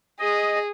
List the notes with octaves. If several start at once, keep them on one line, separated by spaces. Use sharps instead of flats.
G#4 D#5